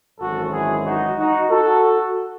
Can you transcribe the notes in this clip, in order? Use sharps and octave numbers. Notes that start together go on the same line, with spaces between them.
G#1 F#2 E3 G#3 F#4 A4
E4 G#4
D#4 F#4
D#4 F#4
F#4 A4